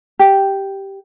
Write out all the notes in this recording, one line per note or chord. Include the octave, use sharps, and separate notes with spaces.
G4